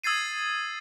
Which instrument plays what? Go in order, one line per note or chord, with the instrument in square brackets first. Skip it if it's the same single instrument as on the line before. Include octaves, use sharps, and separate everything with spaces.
[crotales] D#6 E6 G#6 A6 C7 D#7